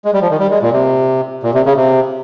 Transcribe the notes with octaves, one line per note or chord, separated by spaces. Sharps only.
G#3
G3
F3
D#3
G3
G#3
A#2
C3
A#2
C3
C#3
C3